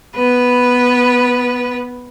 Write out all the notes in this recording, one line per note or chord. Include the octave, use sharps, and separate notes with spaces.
B3 B4